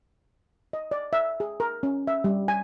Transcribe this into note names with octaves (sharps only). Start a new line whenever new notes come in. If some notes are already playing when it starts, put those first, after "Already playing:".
D#5
D5
E5
G#4
A#4
C#4
E5
G3
G#5